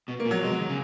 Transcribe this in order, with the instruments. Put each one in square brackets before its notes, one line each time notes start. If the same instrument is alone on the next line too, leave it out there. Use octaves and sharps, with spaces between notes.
[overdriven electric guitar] B2
[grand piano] A#3
[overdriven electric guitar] A#2
[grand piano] F#3
[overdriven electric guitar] B2 [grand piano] G#3
[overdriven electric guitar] F#3
D#3
C#3